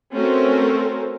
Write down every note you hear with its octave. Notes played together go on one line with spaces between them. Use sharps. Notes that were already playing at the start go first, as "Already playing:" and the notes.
A3 C4 C#4 F#4 A4 A#4